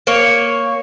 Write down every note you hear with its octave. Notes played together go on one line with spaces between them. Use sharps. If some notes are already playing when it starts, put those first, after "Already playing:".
A#3 C#5